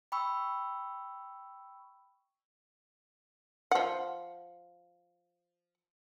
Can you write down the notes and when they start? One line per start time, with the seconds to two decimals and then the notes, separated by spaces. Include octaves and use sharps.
0.12 G5 B5 C#6 E6
3.71 F3 F#5